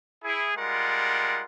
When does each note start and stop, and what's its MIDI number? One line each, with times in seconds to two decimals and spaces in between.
0.24 0.50 64
0.24 0.50 68
0.57 1.43 55
0.57 1.43 56
0.57 1.43 65
0.57 1.43 70
0.57 1.43 78